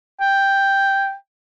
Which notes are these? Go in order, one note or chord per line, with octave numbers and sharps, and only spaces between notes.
G5